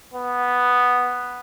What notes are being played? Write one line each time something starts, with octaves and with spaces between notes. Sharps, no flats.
B3